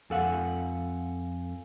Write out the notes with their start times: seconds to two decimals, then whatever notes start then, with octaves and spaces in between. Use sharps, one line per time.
0.10 F2 A4 F5 F#5 G#5